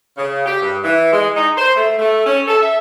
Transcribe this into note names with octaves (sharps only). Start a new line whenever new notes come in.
C#3
G4
G2
E3
G#3
D#4
C5
A3
A3
C#4
A4
E5